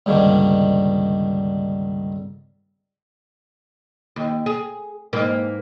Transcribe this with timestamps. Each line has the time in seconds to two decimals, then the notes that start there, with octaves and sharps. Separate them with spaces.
0.06 C#2 G2 D3 D#3 A#3
4.16 D#2
4.46 G#4
5.13 G#2 E3 A#3